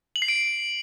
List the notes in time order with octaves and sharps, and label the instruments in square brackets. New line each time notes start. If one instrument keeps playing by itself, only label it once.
[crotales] F#7
C7
D7